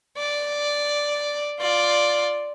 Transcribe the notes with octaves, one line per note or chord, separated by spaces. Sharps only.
D5
F4 D5